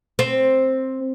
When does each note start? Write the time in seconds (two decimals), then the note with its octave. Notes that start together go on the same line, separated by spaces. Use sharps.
0.19 C4